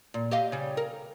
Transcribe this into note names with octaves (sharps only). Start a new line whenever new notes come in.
A#2
G4 D#5 F5
C#3 G3
A#4